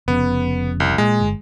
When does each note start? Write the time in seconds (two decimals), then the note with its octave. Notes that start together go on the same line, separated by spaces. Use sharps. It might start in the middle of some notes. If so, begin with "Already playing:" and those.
0.08 F1 C#3 B3
0.80 C2
0.98 A#2 G#3
1.20 G1